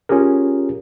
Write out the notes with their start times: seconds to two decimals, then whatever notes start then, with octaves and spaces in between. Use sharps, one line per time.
0.09 C#4 F4 G4 G#4 A#4